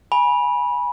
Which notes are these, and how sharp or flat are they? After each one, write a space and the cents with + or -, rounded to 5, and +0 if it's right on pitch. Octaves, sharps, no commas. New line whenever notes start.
G#5 +0 B5 -20